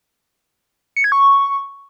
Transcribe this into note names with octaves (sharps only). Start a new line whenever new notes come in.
C#7
G#6
C#6